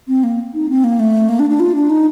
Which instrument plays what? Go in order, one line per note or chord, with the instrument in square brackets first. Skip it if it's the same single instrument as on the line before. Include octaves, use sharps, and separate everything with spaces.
[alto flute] C4
A#3
D#4
C4
A#3
A3
A#3
D4
D4
F4
D4
D#4